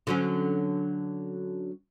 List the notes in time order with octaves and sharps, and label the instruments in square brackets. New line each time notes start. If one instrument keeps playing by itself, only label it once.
[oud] D3 F#3 C#4